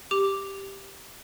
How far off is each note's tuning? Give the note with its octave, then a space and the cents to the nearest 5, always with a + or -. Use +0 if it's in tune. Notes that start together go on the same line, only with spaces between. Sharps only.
G4 +0 D6 +0